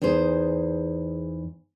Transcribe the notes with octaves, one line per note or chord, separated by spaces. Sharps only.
E2 D#4 G#4 C5